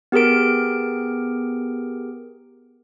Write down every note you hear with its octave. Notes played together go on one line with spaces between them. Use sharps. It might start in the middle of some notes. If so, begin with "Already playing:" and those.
B3 G4 G#4 A#4 D7